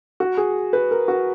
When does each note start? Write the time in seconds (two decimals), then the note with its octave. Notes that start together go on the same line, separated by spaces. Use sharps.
0.20 F#4
0.37 G#4
0.73 B4
0.91 A#4
1.08 F#4